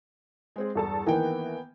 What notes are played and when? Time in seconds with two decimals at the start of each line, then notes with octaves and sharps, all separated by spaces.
0.56 G#3 C4 G#4
0.75 E2 G2 A4 A5
1.07 D#3 E3 A#3 B3 G5 G#5